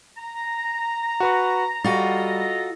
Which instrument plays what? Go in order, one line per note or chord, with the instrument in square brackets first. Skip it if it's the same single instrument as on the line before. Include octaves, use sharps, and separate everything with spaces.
[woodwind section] A#5
[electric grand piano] F#4 B4 C#6
[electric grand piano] G3 [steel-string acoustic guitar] F4 F#4 [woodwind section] A4 D#5 A#5